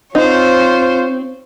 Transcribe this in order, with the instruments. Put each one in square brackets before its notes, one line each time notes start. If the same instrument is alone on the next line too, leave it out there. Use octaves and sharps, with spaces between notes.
[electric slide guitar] C4 [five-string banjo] D#4 [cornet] F4 [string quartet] C5 C#5